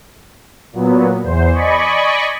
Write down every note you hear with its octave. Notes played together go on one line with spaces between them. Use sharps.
A#2 F#3 B3
E2 C5
D5 D#5 G#5 B5 C#6